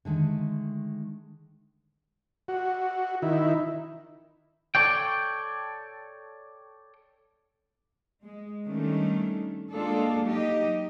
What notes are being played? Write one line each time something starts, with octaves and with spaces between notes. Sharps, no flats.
D3 D#3 G#3 A3
F#4
D#3 E4
A4 C#5 D5 G5
G#3
D#3 G3 A3 C#4 D4
G#3 A#3 D4 F4 A4
F#3 D#4 G4 D#5